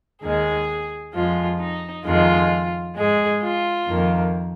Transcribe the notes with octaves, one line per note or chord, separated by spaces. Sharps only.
D#2 D#3 G#3 G#4
F2 F3 G#3 F4
D#4
F2 D#3 G#3 F4
G#2 G#3 G#4
F4
F2 D#3 A#3